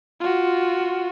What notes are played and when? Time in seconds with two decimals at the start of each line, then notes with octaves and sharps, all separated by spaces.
0.20 F4 F#4